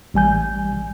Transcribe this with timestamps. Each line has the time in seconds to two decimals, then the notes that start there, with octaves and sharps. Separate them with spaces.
0.14 A1 G3 G#5 G6